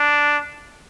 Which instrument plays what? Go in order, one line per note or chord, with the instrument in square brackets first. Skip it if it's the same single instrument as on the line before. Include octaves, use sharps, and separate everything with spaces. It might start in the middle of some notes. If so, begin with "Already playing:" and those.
Already playing: [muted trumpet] D4